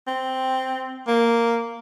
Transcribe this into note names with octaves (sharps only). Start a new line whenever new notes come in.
C4
A#3